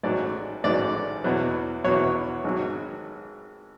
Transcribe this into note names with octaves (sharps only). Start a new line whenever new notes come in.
A1 G#2 F#3 D5
A1 G#2 F#3 D5
E2 B2 F#3
E2 B2 F#3 C#5
G#1 G#2 F#3